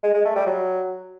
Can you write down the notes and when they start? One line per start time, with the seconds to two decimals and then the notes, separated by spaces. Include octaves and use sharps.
0.04 G#3
0.14 G#3
0.25 A3
0.36 G3
0.47 F#3